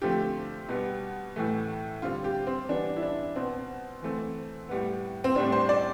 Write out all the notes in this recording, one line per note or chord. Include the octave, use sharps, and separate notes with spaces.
D3 F3 A3 C4 G4
B2 G3 B3
A2 E3 A3
D3 G3 C4 F4
G4
C4
E3 G3 B3 D4
E4
D4
B2 B3 C4
E3 A3 C4
A2 G3 B3
C4
A2 G3 C4 D4
C5
D5